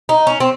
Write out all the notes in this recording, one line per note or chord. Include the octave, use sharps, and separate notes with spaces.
D#4
C#4
C4